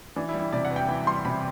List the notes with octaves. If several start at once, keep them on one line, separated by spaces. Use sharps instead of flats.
E3 D4
E4
G3
E4
C3 D5
F#5
E2
G5
E3
G3 C6
C3 B5